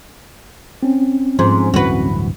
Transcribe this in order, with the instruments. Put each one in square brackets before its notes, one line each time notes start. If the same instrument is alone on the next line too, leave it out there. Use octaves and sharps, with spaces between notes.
[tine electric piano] C4 C#4
[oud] G#2 [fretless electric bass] F3
[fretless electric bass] D1 G2 E3 [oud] F#4 B4